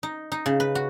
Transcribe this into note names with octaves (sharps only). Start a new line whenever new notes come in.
D#4
D#4
C#3
B4
F#4